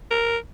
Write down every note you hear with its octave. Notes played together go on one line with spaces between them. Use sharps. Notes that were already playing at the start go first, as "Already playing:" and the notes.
A#4